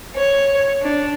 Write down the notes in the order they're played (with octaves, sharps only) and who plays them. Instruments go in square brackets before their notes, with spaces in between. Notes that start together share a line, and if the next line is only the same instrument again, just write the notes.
[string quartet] C#5
D4